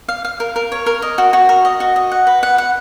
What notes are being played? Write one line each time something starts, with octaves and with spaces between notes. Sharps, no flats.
F5
F5
A#4
A#4
C#5
A#4
D#5
F#4
F#4
A#4
D#5
F#4
D#5
F#5
B4
F#5
F#5